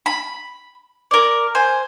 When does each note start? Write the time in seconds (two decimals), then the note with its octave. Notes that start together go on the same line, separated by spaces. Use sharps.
0.06 B5
1.11 A#4 D5
1.55 C5 G#5